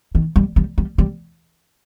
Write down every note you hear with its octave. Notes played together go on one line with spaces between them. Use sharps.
D#3
G3
G3
G3
G3